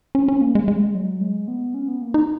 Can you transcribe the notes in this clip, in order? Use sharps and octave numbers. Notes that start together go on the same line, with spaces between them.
C#4
C#4
A#3
G#3
G#3
F#3
G#3
B3
C#4
B3
A#3
D#4